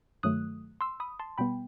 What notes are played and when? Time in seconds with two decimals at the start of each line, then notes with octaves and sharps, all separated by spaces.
0.23 G2 D#3 F#3 A3 D#6 F#6
0.81 C6 E6
1.00 B5 D#6
1.19 A5 C6
1.38 B2 G3 B3 G5 B5